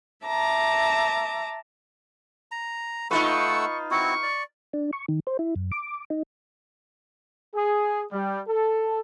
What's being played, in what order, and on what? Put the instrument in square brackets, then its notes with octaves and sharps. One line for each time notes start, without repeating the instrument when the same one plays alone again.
[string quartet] E5 A5 A#5 D6
[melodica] A#5
[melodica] A3 F#5 E6 [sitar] D#4 F4 B4 [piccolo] C#6
[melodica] C4 E4 F#4 [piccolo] C#6
[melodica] D5
[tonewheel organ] D4
C#6
D#3
C5
E4
F#2
D6
D#4
[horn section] G#4
G3
A4